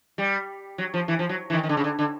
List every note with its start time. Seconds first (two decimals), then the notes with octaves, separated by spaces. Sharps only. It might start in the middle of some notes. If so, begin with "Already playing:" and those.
0.18 G3
0.78 F#3
0.94 F3
1.08 E3
1.19 F3
1.29 F#3
1.50 E3
1.53 D#3
1.63 D#3
1.69 D3
1.77 C#3
1.84 D3
1.99 D3